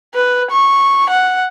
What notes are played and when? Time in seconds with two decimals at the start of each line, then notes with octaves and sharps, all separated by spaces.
0.15 B4
0.51 C#6
1.09 F#5